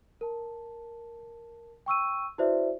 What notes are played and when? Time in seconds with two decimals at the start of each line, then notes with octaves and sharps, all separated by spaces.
0.21 A#4 A5
1.86 G5 C#6 E6 D#7
2.38 E4 F#4 B4 C5 D5 E5